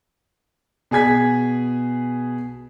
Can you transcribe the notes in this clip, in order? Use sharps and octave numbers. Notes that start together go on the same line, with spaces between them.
B2 G#4 G#5 G#6 B6